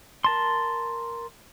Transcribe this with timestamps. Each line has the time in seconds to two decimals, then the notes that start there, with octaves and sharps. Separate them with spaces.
0.24 A#4 A5 C6